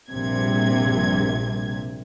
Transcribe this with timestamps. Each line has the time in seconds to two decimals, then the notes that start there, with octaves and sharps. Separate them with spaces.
0.11 A#1 G2 C3 G#6